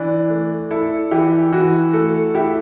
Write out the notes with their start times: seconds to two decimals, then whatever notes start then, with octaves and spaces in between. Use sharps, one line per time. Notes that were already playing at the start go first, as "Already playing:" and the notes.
Already playing: E3 D4
0.30 A3
0.71 E4 A4
1.11 E3 G4
1.52 E3 F#4
1.93 A3 A4
2.35 E4 G4